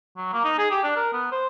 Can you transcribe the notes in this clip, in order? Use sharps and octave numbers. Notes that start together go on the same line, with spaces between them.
F#3
A#3
D#4
G#4
G4
D4
A#4
B3
C5